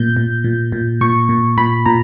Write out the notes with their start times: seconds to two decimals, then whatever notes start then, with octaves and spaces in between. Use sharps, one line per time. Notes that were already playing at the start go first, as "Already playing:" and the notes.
Already playing: A#2 G6
0.17 A#2
0.44 A#2
0.72 A#2
1.01 A#2 C#6
1.29 A#2
1.57 A#2 B5
1.86 A#2 A#5